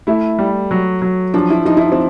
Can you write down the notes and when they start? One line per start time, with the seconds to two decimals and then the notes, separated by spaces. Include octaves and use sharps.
0.07 A3 E4
0.39 G3
0.71 F#3
1.02 F#3
1.34 F3 D4
1.50 E4
1.65 F3 D#4
1.77 E4
1.81 D#4
1.92 C4